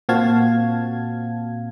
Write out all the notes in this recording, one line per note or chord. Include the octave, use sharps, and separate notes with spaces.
A#2 C4 F#4 F5 A5 G#6